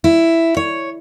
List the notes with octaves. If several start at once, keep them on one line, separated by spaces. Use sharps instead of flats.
E4
C#5